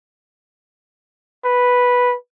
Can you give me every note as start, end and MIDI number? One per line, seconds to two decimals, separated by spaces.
1.45 2.15 71